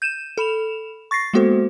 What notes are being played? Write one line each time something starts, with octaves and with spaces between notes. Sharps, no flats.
G6 D#7 E7
A4 B5 E7 F7
C#6 A6 A#6 C7
G#3 A#3 B3 F#4 A4 C5